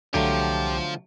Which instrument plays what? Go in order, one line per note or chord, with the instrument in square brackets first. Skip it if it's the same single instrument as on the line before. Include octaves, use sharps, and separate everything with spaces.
[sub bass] C2 [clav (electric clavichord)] D3 F#3 A3 [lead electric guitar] F3 F4 [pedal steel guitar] G4